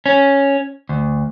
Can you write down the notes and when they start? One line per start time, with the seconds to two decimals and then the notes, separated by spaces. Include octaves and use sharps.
0.06 C#4
0.89 D2